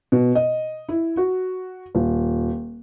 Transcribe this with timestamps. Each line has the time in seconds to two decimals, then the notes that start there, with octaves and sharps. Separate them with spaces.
0.12 B2
0.35 D#5
0.89 E4
1.17 F#4
1.95 D#1